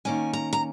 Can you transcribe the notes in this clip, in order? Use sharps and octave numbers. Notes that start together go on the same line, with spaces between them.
D#3 A#3 C#4 G#5
A#5
A#5